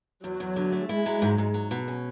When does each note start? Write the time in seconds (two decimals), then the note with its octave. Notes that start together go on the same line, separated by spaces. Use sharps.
0.24 E2 F#3
0.40 E2
0.56 D3
0.72 A3
0.89 G#3 E4
1.06 F#3
1.22 G#2
1.38 G#2
1.54 F#3
1.71 B2
1.88 C#4